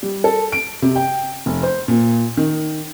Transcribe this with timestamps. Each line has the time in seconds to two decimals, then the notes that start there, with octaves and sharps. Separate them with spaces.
0.03 G3
0.24 A4
0.52 D7
0.82 C3
0.96 G5
1.46 F1
1.63 C5
1.88 A#2
2.37 D#3